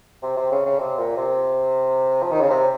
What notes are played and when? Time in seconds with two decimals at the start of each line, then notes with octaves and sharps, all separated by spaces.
0.22 C3
0.37 C3
0.51 C#3
0.66 C#3
0.79 C3
0.99 A#2
1.17 C3
2.22 F3
2.31 D#3
2.41 C#3
2.50 C3